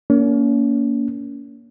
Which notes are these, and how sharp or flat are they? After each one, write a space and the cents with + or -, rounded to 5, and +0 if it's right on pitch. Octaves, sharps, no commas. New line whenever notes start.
A#3 +0 C#4 +40